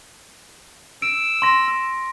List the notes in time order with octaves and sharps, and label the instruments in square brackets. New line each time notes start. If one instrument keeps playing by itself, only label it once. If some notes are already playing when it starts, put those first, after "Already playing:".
[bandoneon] E6 [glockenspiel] D7
[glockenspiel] C6 A#6